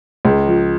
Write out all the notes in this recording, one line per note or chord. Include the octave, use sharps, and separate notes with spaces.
C#2
F3